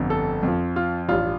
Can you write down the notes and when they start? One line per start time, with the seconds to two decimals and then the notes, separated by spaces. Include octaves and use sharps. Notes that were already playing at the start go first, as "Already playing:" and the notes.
Already playing: G1 F2 D3
0.10 A4
0.43 F2 F3
0.76 F4
1.08 A1 G2 G3 F4